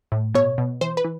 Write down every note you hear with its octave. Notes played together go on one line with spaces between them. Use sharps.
A2
B2 C#5
B2
E3 C5
B4
E3